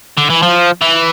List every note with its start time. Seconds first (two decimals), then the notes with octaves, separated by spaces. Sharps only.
0.17 D3
0.30 E3
0.43 F3
0.81 E3